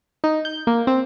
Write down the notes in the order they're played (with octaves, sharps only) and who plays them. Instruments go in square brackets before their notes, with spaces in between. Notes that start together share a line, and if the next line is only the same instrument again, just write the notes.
[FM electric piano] D#4
G6
A#3
C4